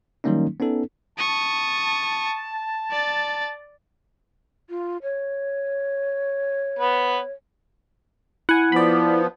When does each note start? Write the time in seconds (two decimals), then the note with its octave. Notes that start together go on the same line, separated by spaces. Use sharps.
0.24 D#3 F#3 G3 A#3 C#4 D#4
0.60 B3 C#4 D#4 A4
1.18 A5 C#6 D#6
2.91 D5 A6
4.69 F4
5.03 C#5
6.79 B3 B4
8.49 E4 F#5 G#5
8.72 F3 B3 D5 B5